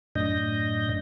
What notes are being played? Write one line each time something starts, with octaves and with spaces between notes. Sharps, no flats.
F#2 A2 D4 D#5 G6 A#6